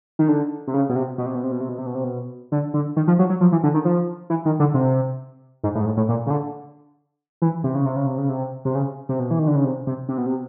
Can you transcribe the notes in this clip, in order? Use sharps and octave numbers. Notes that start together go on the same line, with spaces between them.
D#3
D3
C3
C#3
B2
C3
B2
C3
B2
C3
B2
C3
B2
C3
B2
C3
B2
D3
D3
D#3
F3
F#3
F#3
F3
E3
D3
D#3
F3
E3
D#3
D3
C3
G#2
A2
G#2
A2
A2
A#2
C#3
D3
E3
C3
C#3
C3
C#3
C3
C#3
C3
C3
C#3
C3
B2
E3
D#3
D3
C#3
C3
C3
C3
B2
C3